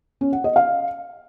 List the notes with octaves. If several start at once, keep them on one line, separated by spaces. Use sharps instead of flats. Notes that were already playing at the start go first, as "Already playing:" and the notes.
C#4
F#5
D#5
F5